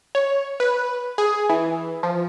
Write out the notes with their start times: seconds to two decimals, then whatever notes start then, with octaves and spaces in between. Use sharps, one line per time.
0.15 C#5
0.60 B4
1.18 G#4
1.49 E3
2.03 F3